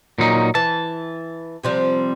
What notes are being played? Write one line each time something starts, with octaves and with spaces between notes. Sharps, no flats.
A#2 F#3 D#4
E3 A5
C3 F3 G3